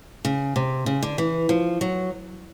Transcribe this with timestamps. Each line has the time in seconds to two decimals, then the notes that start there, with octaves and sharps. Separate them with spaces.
0.25 C#3
0.56 C3
0.86 C#3
1.03 D3
1.18 E3
1.49 F3
1.81 F#3